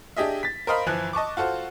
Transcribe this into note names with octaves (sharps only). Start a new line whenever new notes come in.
D4 G4 G#4 D#5 E5
A6 B6
A#4 C5 D#5 F5 B5
G1 E3 F3 F#6
D#5 A5 C#6 D6
F4 F#4 A4 C5